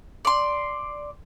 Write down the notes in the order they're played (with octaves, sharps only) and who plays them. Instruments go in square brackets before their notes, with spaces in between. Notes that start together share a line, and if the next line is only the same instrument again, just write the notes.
[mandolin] D5 C6